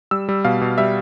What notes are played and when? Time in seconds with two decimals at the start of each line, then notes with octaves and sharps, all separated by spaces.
0.11 G3 E6
0.29 G3
0.45 B2 F5
0.61 B2
0.78 G3 E5